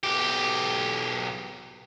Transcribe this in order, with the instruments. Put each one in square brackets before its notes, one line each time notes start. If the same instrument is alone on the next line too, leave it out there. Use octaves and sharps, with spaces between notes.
[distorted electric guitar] B1 G4